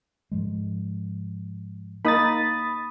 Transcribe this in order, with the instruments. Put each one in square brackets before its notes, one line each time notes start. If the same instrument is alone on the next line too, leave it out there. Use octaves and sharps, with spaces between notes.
[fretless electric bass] G#2 F3 G#3
[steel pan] A#3 D#4 [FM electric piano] B5 D#6 A6